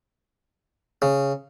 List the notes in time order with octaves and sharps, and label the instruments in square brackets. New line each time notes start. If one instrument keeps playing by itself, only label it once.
[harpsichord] C#3